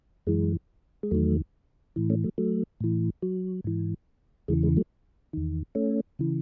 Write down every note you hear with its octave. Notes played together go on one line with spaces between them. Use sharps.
F#2 E3 G#3
G#3
E2 D#3 F#3 A3
A2 E3
A3 C#4
F#3 A3
F#3 A3
A2 E3
F#3
G#2 E3
E2 C#3 E3 G#3
G#3
F#3 A3
E2 D#3
A3 C#4
C#3 E3